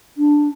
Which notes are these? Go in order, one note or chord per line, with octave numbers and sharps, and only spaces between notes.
D4